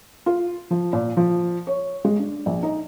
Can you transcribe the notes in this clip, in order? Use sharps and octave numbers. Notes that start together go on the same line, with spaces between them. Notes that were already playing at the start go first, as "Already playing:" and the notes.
F4
F3
A#2
F3
C#5
G#3
D4
A#1
D#4